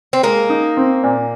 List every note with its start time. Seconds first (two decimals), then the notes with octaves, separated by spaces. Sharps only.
0.13 C4
0.23 G#3 A#3
0.49 D#4
0.77 C4
1.03 A#2